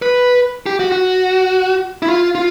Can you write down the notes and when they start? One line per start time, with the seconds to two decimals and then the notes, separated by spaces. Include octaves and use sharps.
0.02 B4
0.66 G4
0.80 F#4
0.92 F#4
2.02 E4
2.09 F4
2.35 F4